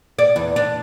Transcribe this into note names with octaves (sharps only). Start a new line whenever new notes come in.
D5
E2
D4